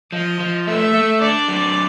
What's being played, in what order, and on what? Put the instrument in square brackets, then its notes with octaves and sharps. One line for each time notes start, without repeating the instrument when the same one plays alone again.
[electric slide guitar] F3 [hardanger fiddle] D#5
[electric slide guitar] F3
[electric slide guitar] A3 [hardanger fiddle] E5
[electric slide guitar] A3
[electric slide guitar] D4 [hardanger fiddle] D5
[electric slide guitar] F#3